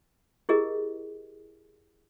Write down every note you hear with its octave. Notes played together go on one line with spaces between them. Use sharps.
E4 G4 G#4 A#4 D#5